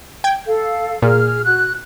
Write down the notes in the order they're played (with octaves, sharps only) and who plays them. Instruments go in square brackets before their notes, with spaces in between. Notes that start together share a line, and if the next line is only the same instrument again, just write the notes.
[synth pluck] G5 G#6
[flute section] A4 F5
[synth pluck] A#2 [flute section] G#4 F6
[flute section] F#4 F#6